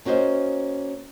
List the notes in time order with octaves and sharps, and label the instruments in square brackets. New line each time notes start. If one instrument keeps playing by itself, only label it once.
[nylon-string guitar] A#3 C#4 F#4 C5 D#5